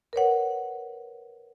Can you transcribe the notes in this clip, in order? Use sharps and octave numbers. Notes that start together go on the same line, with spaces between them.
A#4 B4 C#5 F#5